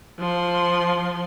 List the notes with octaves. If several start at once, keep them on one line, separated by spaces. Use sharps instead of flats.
F3 C6